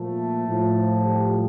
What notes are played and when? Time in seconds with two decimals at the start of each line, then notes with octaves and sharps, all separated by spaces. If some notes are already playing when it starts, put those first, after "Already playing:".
Already playing: A#2 F3 A3
0.47 A2 F3
1.05 G3